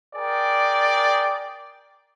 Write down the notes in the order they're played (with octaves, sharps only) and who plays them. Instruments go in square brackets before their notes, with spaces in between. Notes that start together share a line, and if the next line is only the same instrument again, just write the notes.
[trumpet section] G#4 A#4 D5 G5